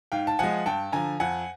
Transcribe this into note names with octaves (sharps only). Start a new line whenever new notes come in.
G#2 F5 G5
A5
F3 G#3 F#5 G#5
G2 G5 A5
D3 F3 G#5 A#5
F2 F#5 G#5